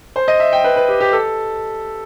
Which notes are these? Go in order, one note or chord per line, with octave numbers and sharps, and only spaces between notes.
C5
D#5
E5
G5
B4
B4
G4
G4
A4